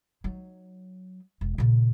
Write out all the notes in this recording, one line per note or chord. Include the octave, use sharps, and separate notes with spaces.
F#3 D#4
E1
A#2 C#3